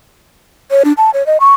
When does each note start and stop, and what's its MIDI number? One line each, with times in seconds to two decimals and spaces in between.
0.71 0.83 73
0.85 0.93 62
0.98 1.10 81
1.14 1.25 73
1.26 1.37 75
1.40 1.55 85